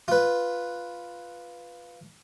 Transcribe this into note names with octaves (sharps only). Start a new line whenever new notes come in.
F4 B4